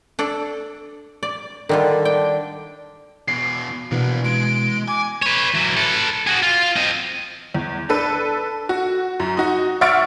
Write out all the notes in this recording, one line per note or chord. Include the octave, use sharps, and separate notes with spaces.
D4 A4 D5
D5
D3 D#3 G3 F4
D4 G5
E2 B2 C7
B2 E3 A#3 B3 D4
G#3 D7
G#5 D6
B4 C#5
E3 F#3
A4 B4
F#4 G#4
F4
C4 D#5
E2
D4 A4 B4
F#4
F#2
D#4 F#4
E5 F#5 C#6 F6 A6 D7